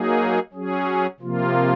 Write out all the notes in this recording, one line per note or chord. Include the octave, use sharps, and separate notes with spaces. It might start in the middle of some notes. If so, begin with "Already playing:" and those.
Already playing: F#3 A#3 D#4 G#4
F#3 C#4 G#4
C3 F3 A#3 F4